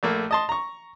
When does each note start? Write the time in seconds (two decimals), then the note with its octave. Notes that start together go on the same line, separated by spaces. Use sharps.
0.03 A#1 A3 A#3
0.31 D#5 A5 C6
0.49 A#5 C#6